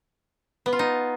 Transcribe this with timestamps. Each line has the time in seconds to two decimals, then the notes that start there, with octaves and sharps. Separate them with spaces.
0.66 B3
0.73 F4
0.79 D#4